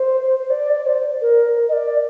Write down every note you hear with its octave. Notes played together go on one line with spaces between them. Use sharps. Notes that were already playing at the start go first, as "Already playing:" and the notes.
Already playing: C5
C5
D5
D5
C5
A#4
D#5
D5